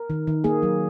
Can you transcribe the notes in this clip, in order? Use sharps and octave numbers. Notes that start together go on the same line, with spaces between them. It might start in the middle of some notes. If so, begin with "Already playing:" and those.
Already playing: A#4
D#3
D#3
A#3 G#4
F#3